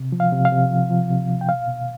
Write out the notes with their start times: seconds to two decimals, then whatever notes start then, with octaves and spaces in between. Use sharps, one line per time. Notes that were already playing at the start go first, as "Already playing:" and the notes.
Already playing: C3
0.12 F3
0.20 F5
0.32 C3
0.45 F5
0.52 C3
0.71 F3
0.90 F3
1.10 C3
1.29 C3
1.41 G5
1.49 B2 F5
1.68 B2